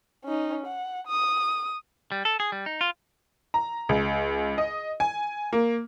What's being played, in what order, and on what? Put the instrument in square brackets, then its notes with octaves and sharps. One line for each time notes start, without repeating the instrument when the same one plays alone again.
[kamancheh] C#4 D#4
F#5
D#6
[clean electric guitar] G3
A4
G#4
G3
D#4
F4
[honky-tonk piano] A#5
C#2
D#5
G#5
A#3